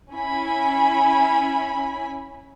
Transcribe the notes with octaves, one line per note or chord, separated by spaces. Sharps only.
C#4 E4 G#5 B5